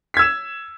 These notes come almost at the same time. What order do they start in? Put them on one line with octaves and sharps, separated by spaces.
B6 G#6 E6 E7